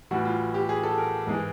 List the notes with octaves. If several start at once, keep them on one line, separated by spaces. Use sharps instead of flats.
A2 E3 G3 F#4
F4
G4
G#4
A4
A#4
G#2 E3 G#3